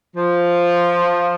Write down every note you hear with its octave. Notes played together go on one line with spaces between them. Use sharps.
F3